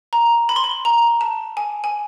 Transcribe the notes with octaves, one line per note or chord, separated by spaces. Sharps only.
A#5
B5
C6
B5
A#5
A5
G#5
G#5